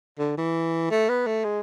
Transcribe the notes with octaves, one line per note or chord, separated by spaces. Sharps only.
D3
E3
A3
B3
A3
G#3